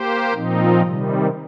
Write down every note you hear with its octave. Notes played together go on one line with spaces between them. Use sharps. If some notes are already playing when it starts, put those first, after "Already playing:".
Already playing: A#3 G4 C5
A#2 F3 C4 D#4
C3 D#3 G3